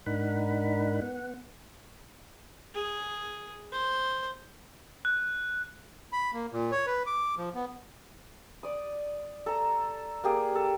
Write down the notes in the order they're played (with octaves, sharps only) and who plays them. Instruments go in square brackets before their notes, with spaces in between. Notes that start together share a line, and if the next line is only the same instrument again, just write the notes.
[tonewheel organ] G#2 D4 D#4 A#4 F#5 B5
B3 F#5
[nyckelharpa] G#4
C5
[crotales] F#6
[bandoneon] B5
A#3
A#2
C#5
B4
D6
F3
B3
[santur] D5 D#6
A4 A#5
A#3 G4 G#4
A4